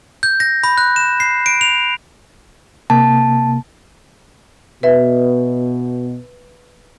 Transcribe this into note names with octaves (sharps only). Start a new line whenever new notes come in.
G6
A#6
B5
F#6
E7
C7
D7
F7
C3 A#3 A5
B2 B4 E5